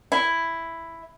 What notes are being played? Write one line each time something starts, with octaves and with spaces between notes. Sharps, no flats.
E4